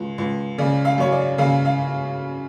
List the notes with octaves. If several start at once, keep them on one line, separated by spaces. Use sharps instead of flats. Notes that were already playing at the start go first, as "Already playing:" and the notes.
Already playing: C#2
C#2
C#3 D5
F5
F#2 C#5
D5
C#3 F5
F5